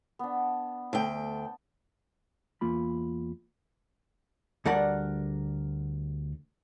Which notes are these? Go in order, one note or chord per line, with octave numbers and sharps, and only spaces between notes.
B3 D4
D2 G5 A5
E2 A#3 F4 B5
D2 G3 A4 A#4 D5 F#5